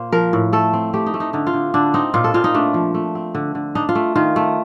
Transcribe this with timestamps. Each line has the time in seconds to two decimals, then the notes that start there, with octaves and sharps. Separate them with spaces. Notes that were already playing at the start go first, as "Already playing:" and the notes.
Already playing: A#2 A#3 C5
0.12 F3 A#4
0.33 A2
0.53 A3 A4
0.73 C4
0.93 A3 G4
1.06 D#4
1.14 A3
1.20 D#4
1.33 D3 D#4
1.47 F4
1.53 D3
1.74 D3 D4
1.94 C4 D#4
2.14 A#2 F4
2.24 A4
2.34 A#2 F4
2.44 D#4
2.54 A3 D4
2.74 F3
2.94 A3
3.15 C4
3.35 D3
3.55 D3
3.75 D4 D#4
3.89 F4
3.95 A3
4.16 D#3 F4
4.36 A3